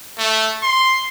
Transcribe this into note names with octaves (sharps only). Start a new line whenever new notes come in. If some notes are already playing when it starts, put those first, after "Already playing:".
A3
C6